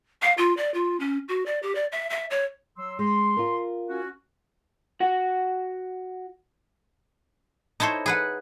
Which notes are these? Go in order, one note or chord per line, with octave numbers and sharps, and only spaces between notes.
F5
F4
D5
F4
C#4
F#4
D5
G4
D5
E5
E5
C#5
F#3 C6 E6
G#3 C6
F4 A#4
C#4 F#4
F#4 F#5
D#4 E4 A4 C5 C#5
G#4 B4 F#5